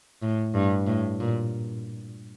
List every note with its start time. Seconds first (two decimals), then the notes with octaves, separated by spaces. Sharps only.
0.22 A2
0.55 G2
0.87 A2
1.20 A#2